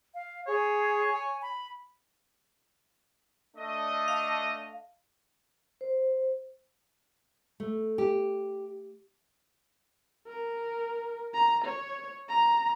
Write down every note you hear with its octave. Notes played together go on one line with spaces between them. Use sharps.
F5
G#4 C#5
G#5
B5
A3 D4 D#5
F5
C5
A3
G4
A#4
A#5
C#5
A#5